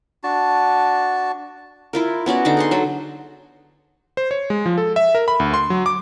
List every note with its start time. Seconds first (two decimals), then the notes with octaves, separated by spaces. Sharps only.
0.23 D4 F#4 A5
1.93 E4 F4 A#4
2.26 B3 C#4 F#4 D5
2.45 D3 D#4 D6
2.57 G#4 F#5 C6
2.71 F#3 A4
4.17 C5
4.31 C#5
4.50 G#3
4.66 F3
4.78 A4
4.96 E5
5.15 A#4
5.28 B5
5.40 D2
5.54 C6
5.70 F#3
5.86 D6